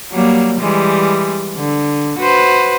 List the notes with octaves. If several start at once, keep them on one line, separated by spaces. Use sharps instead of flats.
F#3 G3 A#3
E3 G3 G#3
D3
F#4 B4 C5